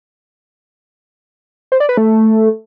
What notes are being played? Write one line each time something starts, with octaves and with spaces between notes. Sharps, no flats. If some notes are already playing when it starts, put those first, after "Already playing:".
C5
D5
B4
A3